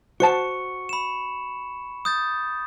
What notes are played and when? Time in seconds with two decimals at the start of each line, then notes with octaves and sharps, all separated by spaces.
0.20 F#4 C5 A5 C#6 C#7
0.89 B5 E7
2.05 D#6 G6 A6